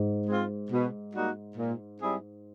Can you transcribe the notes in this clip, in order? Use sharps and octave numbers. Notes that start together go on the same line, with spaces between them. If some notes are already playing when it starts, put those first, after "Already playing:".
Already playing: G#2
G#3 C4 F4
B2
G3 A#3 D#4 F#4
A#2
G3 C4 E4 G#4